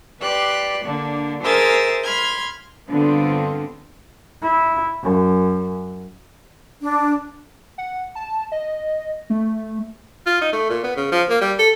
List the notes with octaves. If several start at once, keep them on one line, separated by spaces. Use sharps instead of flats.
G4 B4 D5 C6 F#6
D3 A#3 D4
G#4 A#4 C5 E5 D#6 A6
B5 C6 F6 G#6
G2 D3 B3 C4 F4
E4
F#2
D4
F#5
A5
D#5
A3
F4
D#4
A3
A#2
B3
C#3
F3
A#3
G3
A4